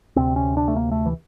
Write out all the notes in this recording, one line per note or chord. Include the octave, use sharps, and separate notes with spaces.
D2 C3 C4
C#4
D4
A3
A#3
A3
E3